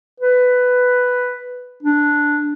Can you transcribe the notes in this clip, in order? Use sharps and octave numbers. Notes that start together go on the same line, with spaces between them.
B4
D4